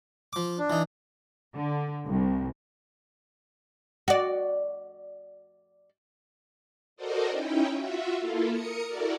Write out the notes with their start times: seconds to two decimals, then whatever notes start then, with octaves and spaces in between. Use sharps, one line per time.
0.33 F3 D6
0.58 D4
0.70 E3 D#4
1.55 D3
2.08 C2
4.08 F#4 D5
6.96 F#4 A4 A#4 C5 D5 D#5
7.30 C#4 D#4 E4 G5
7.72 F4 F#4 E5
8.18 A#3 E4 F4 A4
8.49 A#4 D#6 C#7
8.86 E4 F#4 A4 A#4 D5